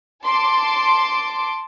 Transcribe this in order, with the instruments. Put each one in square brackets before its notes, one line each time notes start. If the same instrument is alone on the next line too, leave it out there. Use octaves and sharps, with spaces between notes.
[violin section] A5 C6 D6